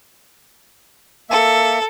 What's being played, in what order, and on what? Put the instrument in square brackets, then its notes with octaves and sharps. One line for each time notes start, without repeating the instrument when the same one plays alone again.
[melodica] A#3 E5 [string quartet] A4